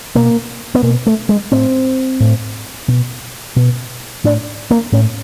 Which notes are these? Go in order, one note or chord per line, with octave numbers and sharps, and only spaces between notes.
B2 A#3
B3
B2 A#3
A3
G#3
A2 C4
A2
B2
B2
A2 D4
A#3
A2 C#4